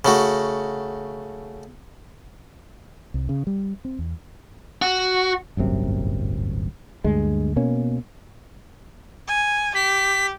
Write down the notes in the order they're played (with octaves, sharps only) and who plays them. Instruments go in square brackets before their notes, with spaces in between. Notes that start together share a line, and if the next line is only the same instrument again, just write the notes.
[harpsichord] C#3 A3 F#4
[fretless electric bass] C2
C#3
G3
C4
E2
[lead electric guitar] F#4
[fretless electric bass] D1 G1 F#2 C3
D2 G2 G#3
B2 A#3 C#4
[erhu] G#5
[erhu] G4 [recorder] B6